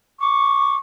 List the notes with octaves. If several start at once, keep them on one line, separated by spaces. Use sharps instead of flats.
C#6 D6